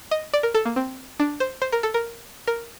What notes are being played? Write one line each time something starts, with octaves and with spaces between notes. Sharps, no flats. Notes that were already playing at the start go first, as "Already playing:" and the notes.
D#5
D5
A#4
A4
A#3
C4
D4
C5
C5
A#4
A4
A#4
A#4